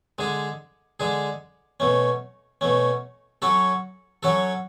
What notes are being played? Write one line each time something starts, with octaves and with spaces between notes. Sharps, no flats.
D3 G#3 D4 G#4
D3 G#3 D4 G#4
B2 A3 C#4
B2 A3 C#4
F#3 C#4 F#4 A4
F#3 C#4 F#4 A4